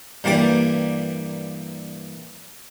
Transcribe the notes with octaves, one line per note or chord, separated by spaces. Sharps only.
G2 E3 A#3 G4 D5 D6